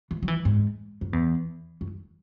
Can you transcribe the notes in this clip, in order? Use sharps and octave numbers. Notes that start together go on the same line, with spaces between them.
E3
F#3
E3
G#2
F#2
E2
F#2